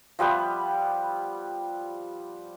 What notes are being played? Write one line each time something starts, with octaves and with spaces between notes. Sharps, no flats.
F3 G3 B3 B4